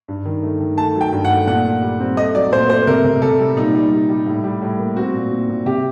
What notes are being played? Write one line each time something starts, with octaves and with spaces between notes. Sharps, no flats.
G2
D#3
A3
D#3
A3 A5
F#3
G5
G2
F#5
A3
A#2 F#5
A#2
G3
C4
A3 D#5
F#3 D5
A#2 C5
A3 C5
C3 A#4
C3
C3 A4
G3
A#2 D#4
G3
G3
G3
A2
G3
A2
A#3
C4 F#4
A#2
A#2
A#2
C3 G4